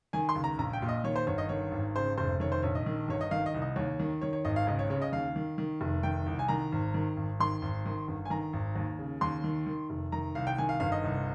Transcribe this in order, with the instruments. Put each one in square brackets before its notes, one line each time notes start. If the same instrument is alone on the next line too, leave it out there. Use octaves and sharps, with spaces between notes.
[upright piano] D#3 G#5
C6
C#2
A#5
A#1 A#5
G5
A#2
D#5
D#3 C#5
C5
G1 C#5
D#5
D#3 C#5
G#1
C#3 C5
F1 C5
D#3 C#5
C5
A#1 C#5
D#5
D#3
G1 C#5
D#5
D#3 F5
D#5
C2
D#5
D#2 C#5
D#3
D#3 C#5
C#5
G#1 D#5
F5
C#2 D#5
C#5
C#3 C#5
D#5
D#2 F5
D#3
D#3
F1
D#3 G5
C2
G#5
D#3 A#5
G#1
D#3
G#1
D#3 C6
G#1
D#3
G1
G#5
D#3 A#5
G#1
D#2
C#3
D#2 C6
D#3
D#3
F1
D#3 A#5
C2 F5
G5
D#3 G#5
F5
G1 F5
D#5
C2